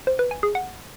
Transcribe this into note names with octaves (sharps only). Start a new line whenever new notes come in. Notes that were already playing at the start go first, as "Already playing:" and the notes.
C5
B4
G#5
G#4
F#5